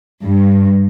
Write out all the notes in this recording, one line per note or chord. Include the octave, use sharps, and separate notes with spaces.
G2